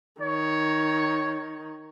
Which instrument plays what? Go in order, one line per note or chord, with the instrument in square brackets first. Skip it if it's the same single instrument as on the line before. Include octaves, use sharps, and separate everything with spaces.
[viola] D#3 [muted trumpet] C#5